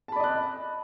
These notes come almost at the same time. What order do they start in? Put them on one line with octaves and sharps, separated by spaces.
A5 B5 D5 D#5 F#6